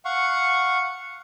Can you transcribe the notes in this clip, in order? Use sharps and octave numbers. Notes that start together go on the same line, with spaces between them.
F5 F#5 C#6